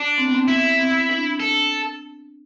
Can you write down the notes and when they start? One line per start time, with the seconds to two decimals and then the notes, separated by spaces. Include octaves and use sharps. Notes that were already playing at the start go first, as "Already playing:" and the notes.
Already playing: D4
0.18 C4
0.26 B3
0.35 C4
0.48 B3 E4
0.79 C4
1.10 D4
1.40 D4 A4